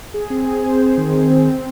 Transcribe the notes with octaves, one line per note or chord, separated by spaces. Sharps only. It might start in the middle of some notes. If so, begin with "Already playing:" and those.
G#4
C4
G#4
C5
C5
D#3
D#3
C4
C4